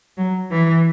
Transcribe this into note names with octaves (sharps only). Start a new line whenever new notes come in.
F#3
E3